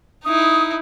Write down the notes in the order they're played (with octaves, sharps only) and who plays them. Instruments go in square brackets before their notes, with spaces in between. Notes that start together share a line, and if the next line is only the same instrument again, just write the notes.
[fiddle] D#4 E4 [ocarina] D#6